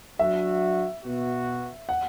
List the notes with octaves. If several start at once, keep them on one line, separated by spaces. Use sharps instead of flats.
F#3 D4 F#4 E5
B2 B3 F#4
F#5